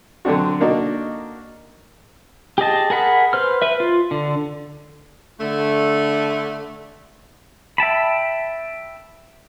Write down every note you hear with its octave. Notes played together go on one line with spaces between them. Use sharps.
D3 F#3 C4 D4 F#4
A#3 D4 D#4 F#4
G4 G#4 D#5 A5
G#4 A#4 F#5 B5
B4 C5 F6
B4 E5
F4
D3
D3 A3
E5 G5 A5 B5